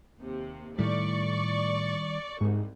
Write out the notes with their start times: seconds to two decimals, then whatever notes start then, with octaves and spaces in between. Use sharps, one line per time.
0.20 D#2 C3
0.78 A2 D#3 G3 D5 C#6
2.41 C2 G#2